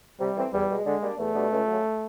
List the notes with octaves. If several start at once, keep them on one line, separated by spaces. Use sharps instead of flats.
C3 G3
E3 A3 C4
E2 G3
B2 G#3
D3 G#3
G3 A#3 D4
E2 A3
B2 G3 B3 D4
C#2
C#3 F#3